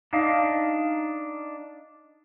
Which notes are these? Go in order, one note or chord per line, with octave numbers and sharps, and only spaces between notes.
D4 D#4 F5